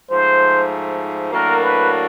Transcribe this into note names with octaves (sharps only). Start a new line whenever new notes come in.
G#2 F3 A3 C5
A2 F#3 A#3 D4 F#4 A#4
B4